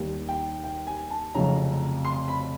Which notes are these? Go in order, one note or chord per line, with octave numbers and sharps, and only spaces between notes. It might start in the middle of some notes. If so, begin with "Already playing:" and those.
Already playing: D#2 D#3 G3
G5
G5
G#5
A5
F1 F2 C#3 F#3 A#5
C6
B5